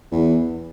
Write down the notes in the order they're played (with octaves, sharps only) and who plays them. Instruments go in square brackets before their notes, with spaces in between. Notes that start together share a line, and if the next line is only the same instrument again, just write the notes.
[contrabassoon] E2